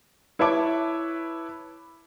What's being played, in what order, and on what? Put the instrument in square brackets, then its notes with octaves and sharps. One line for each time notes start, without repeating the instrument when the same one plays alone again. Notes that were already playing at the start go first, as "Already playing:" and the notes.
[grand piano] E4 B4 C#5 E5 A5 D6